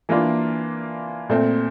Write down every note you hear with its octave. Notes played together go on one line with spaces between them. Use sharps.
E3 A#3 D4 F4
A#2 A3 C4